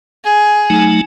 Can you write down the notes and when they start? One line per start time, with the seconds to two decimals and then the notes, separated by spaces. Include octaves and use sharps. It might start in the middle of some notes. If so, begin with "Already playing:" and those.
0.24 G#4
0.70 F#3 A3 D#4